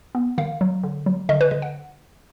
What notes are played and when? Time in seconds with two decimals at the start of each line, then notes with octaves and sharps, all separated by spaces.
0.15 B3
0.38 D#3 F5
0.61 F#3
0.84 D3
1.06 F#3
1.29 D3 D#5
1.41 B4
1.51 D3 D#5
1.62 F#5